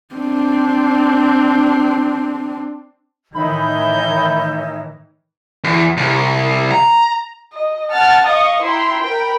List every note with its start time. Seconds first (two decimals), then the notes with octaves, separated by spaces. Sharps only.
0.15 C4 D4
3.34 A2 D#3 E3 D#4 C#5 E5 B5 G6
5.64 E2
5.97 C2
6.71 A#5
7.53 D#5
7.92 F#5 A5 F6 A6
8.26 D#5 F5 C#6 D#6
8.63 E4 G5 A#5 C6
9.04 A#4 G5 B5